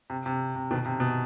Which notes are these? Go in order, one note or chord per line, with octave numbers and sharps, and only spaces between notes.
C3
C3
C3
B2 D#3
C3
B2